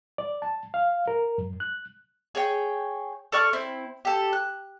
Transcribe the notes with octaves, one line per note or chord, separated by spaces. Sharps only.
D5
A5
F5
A#4
F#2
F#6
G#4 C#5 G5
A4 D5 C#6 F6
C4 E4
G4 A4
F#6